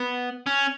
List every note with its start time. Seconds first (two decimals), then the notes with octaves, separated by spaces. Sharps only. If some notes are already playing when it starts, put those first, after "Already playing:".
Already playing: B3
0.46 C#4